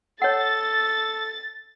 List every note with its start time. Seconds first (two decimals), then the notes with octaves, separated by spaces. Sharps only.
0.22 A4 C#5 F#5 A6